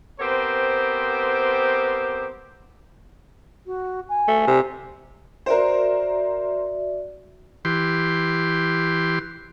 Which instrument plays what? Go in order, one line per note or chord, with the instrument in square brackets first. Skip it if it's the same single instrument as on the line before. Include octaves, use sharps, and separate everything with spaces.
[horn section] B3 C4 G4 A#4 C5
[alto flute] F#4
G#5
[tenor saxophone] A3
C3
[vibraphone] F#4 D5 E5 [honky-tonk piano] A#4 C5
[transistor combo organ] E3 G4 C6